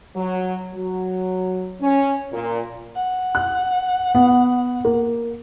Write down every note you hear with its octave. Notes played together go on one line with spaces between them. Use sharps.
F#3
F#3
C#4
A#2
F#5
F#6
B3
A#3